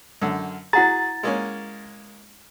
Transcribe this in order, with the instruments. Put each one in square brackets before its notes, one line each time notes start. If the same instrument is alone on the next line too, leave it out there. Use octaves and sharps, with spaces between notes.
[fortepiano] F#2 D3
[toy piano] E4 F#5 A#5 [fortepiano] F#4 G#4 [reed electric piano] A6
[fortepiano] G#3 A#3 C#4